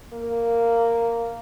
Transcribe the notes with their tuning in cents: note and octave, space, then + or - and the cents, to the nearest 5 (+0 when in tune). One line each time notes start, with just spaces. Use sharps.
A#3 -10